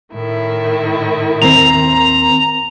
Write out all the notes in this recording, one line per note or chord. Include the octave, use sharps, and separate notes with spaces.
A2 D#3 E4
D#2 C4 A#5 F7